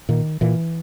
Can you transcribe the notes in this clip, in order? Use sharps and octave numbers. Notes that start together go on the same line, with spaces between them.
A#2 D#3
A#2 E3